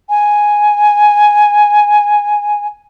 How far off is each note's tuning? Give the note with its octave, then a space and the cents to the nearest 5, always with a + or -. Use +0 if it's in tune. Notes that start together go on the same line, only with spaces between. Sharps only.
G#5 +0